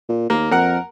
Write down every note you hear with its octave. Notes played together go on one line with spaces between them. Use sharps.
A#2
D#2 A#3
F2 A#4 F#5